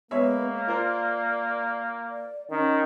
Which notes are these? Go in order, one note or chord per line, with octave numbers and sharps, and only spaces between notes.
G#3 A#3 B3 C#5 E5
F4 A#4 C5 D5
D5
D#3 C#4